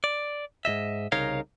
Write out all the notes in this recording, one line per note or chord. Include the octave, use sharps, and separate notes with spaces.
D5
G#2 C3 D#5 E5
C2 C#3 D#4 A#4 C#5 F5